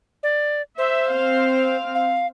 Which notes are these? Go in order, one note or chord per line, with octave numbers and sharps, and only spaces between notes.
D5
C5 E5
C4 F5
F5